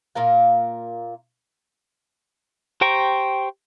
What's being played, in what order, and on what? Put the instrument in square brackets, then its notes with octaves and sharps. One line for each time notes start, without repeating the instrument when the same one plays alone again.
[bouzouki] A#2 A#3 A#4 F5
[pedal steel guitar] G4 C5 G5 A#5 C#6